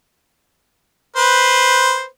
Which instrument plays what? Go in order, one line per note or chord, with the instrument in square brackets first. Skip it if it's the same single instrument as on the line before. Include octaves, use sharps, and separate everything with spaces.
[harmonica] B4 C5